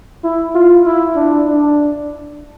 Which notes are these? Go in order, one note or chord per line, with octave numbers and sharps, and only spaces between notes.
E4
F4
E4
D4
D4